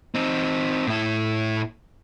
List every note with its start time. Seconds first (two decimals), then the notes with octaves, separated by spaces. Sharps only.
0.15 C4 D#4
0.87 A2 E4